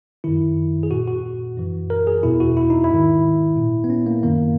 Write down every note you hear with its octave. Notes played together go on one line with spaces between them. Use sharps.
F#2 D#3 E4
G#4
A#2 F#4
F#4
F#2 E3
A#4
G#4
E2 B2 E4
F#4
E4
D#4
E4
G#2 D#3
A#2
B3
C#4
A#3
F#2 D#3 A#3